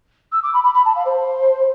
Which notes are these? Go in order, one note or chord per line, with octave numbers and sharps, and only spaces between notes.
E6
D6
B5
B5
B5
A5
F5
C5